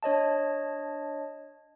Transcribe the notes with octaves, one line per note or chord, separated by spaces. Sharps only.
D4 C#5 D#5 A5